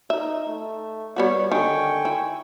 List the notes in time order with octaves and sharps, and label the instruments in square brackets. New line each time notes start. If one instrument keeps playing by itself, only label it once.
[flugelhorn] D#4 [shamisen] E5
[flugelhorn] A3
[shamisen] G3 B3 F#4 [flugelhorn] C#5
[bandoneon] D3 G5 C#6 [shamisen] D#3 [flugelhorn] G#5
[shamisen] E4